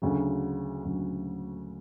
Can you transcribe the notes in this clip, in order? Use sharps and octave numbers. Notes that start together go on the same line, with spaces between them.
D2 C#3 F#3
D2 C#3 F#3